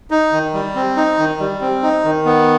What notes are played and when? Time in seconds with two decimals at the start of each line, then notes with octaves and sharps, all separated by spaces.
0.11 D#4
0.32 D#3
0.54 G3
0.75 C4
0.97 D#4
1.18 D#3
1.40 G3
1.61 C4
1.83 D#4
2.04 D#3
2.25 B3